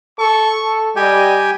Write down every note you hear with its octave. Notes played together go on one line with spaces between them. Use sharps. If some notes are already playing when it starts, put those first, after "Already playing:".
A4 C#6
A4
G3 G4 D#5 G5 G#5